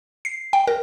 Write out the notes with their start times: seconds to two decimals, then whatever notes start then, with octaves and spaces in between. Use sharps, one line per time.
0.25 C7
0.53 G5
0.67 A#4